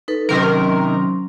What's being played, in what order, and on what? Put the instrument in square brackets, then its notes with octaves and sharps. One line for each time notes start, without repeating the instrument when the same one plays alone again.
[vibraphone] D#4 A4 B4
[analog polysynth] C3 D#3 A#4 [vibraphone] F#3 C#4 C6